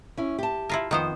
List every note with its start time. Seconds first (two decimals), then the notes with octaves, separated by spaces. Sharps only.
0.17 C#4 E4
0.38 G4 A5
0.69 E4 F4 A#4
0.91 F2 D#3 B3 C5